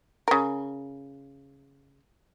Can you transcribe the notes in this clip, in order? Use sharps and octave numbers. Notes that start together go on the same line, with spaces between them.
C#3 A#4